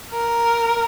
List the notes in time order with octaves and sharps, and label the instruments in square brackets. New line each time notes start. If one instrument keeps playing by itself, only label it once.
[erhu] A#4